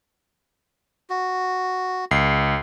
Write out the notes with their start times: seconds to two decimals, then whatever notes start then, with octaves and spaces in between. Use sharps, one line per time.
1.10 F#4
2.11 C#2 C7